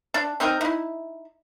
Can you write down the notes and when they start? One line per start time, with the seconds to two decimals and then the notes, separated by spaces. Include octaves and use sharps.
0.14 D4
0.40 C4 D#4 A#4 G5
0.61 D#4 E4